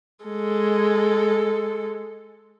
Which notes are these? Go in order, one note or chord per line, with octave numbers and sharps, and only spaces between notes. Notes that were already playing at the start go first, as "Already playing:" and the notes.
G#3 A4